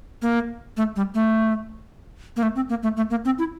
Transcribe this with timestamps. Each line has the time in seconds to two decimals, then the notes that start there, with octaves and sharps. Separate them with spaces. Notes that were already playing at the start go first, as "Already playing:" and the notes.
0.22 A#3
0.77 A3
0.96 G3
1.14 A3
2.36 A#3
2.43 A3
2.56 C4
2.69 A#3
2.83 A3
2.97 A3
3.10 A#3
3.25 C4
3.39 E4